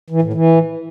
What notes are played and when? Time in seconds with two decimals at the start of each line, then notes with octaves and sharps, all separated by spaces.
0.10 E3
0.22 A2
0.33 E3